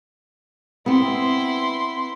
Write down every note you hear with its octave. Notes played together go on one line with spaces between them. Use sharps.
B3 C4 E4 C6